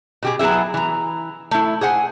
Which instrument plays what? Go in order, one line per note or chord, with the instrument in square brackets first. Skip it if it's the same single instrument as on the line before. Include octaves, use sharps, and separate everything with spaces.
[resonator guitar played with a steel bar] B2 G4 G#4
F#3 B3 E4 G#4 E5
E3 A#5
A3 E4
G#4 C5 F#5 G#5